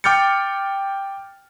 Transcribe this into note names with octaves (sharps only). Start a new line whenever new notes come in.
G5 D6 F6 G6 A6 C#7